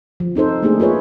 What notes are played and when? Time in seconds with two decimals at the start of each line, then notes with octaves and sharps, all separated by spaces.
0.20 F3
0.35 C4 D#4 A4 C5
0.62 A3 A#3 D4 D#4 G#4
0.80 F4 G#4 B4 C#5